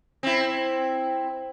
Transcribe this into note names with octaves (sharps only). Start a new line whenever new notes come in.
C4 E4